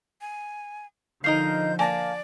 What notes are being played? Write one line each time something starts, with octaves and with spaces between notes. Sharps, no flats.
G#5
D3 F3 D#4 A#4 D#5 F5 G6 C7
A#3 D5 G#5 A5 A#6